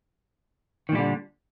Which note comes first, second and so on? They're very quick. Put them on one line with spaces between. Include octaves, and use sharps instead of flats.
D#3 A#2 G3 D3